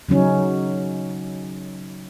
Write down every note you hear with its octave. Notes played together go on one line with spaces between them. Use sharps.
C#3 F#3 C#4 D#4